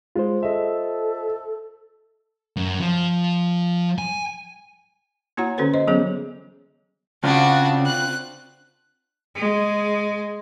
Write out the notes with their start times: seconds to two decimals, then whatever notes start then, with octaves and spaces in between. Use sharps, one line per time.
0.16 G#3 F4 C5
0.43 A4 D#5 E5
2.57 F#2
2.80 F3
3.98 G#5
5.37 A#3 E4 F#4 C#5 F#5 A#5
5.58 D3 C#4 F#4 A4 B4 C5
5.74 C5 D#5
5.87 E3 F#3 B3 C#4 G#4 C#5
7.24 C#3 C4 D4 F4 F#4
7.86 F#6
9.36 G#3 G#4